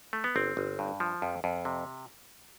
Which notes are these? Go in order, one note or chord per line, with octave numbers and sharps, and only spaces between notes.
A3
B3
G1 C4
G1
G2
F3
F2
F2
C3